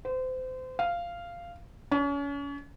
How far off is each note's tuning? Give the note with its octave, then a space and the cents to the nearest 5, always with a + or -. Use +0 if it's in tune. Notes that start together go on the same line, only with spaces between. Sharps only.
C5 -30
F5 -10
C#4 +35